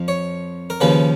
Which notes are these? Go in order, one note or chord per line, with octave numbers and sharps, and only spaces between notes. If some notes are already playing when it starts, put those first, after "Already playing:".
Already playing: F2 F3
C#5
A#4
D#2 C#3 F3 B4